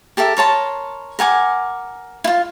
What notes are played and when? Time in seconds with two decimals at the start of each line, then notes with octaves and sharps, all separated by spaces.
0.17 G4 A4 A#4 E5
0.37 A#4 C#5 A5 C6
1.19 A#4 F#5 G#5 D6
2.24 E4 F4